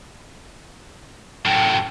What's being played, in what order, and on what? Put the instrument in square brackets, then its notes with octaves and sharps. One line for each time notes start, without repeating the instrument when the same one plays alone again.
[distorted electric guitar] F#2 A2 [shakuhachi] G5